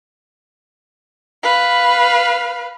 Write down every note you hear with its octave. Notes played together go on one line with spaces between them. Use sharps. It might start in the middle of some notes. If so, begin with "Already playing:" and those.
B4 F5